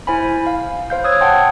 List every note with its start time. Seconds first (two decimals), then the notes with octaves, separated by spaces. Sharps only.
0.07 E4 C5 G#5 B5
0.47 F5
0.90 C5 F5 G6
1.04 C5 C#5 D#6 E6 F#6 G#6
1.20 F#5 G5 A5 C6